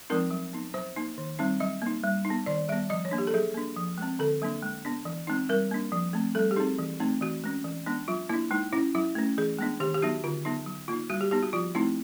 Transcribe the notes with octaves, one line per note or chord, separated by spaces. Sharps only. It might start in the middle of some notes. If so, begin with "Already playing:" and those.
F3 G#3 C4 D#4 A#4
F#3
B3 D#4
F#3 C5
A#3 D#4
D#3
G3 C4 D#4
F#3 D#5
A#3 D#4
G3
D#4
B3
D#3 D5
G3 B3 E5
F3 D#5
C#5
A#3 D4
G4
A4
F#3 G#4
A#3 D4
F3
G#3 C4
D3 A4
F#3 A#3 D4
G#3
B3 D4
E3
G#3 C4 D#4
G3 A#4
A#3 D4
F3
A3 C4
G3 A4
G4
C4 D#4 G#4
E3
A3 C4 D#4
E3 F#4
G#3 C#4
E3
G#3 B3 D4
F#3 F4
A#3 D4 E4
G#3 D#4
C#4 E4
F#3 E4
A3 C#4
E3 G#4
G#3 B3 D4
D#3 G4
G4
F#3 B3 D#4 F#4
D3 F4
F#3 B3 D#4
F#3
A#3 D#4 F4
G3 F#4
G4
B3 D#4 G4
F#4
F3 F4
A3 C4 D#4 E4